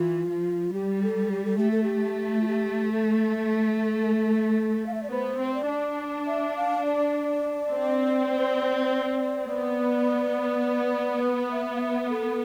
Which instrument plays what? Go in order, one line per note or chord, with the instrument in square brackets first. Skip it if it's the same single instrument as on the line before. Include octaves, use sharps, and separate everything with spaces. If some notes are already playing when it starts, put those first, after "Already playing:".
Already playing: [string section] E3 [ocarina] F4
[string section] F3
[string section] G3 [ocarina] G4
[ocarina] A4
G4
A4
[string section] A3 [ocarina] G4
[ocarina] A4
G4
F4
G4
A4
F5
E5
D5
[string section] B3 [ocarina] C5
[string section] C4
[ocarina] D5
[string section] D4
[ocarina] E5
F5
D5
[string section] C4
[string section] B3 [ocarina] D5
[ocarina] B4
E5
F5
E5
A4